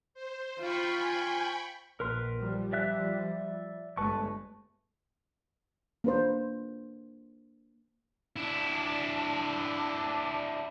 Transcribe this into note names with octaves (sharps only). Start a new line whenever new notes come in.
C5
F4 G5 B5 C#6
G#5
A#1 A#4 B4 C6
F3 G3
D5 E5 F#6
G1 G#3 A3 B4 A5 C#6
A#3 D4 B4 C5
D4 E4